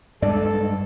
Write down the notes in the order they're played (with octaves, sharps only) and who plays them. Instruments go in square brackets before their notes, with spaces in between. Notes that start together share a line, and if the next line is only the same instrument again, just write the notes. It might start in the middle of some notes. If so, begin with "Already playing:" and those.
[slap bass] G2 G#3 [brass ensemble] A4 [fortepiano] D5